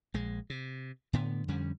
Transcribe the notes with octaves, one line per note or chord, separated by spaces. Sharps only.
A#1 G#3
C3
A2 D3 B3
F2 D3 G3 C#4